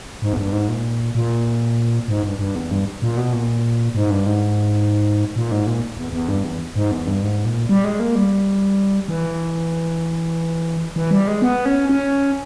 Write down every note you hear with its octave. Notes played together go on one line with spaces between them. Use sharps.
G#2
E2
G2
G#2
A#2
A#2
G#2
G2
G2
E2
G2
A#2
B2
A#2
G#2
G2
G#2
A#2
G#2
A#2
E2
E2
G2
E2
G#2
E2
G2
G#2
A#2
G3
G#3
A#3
G3
E3
E3
G3
G#3
B3
C#4
C#4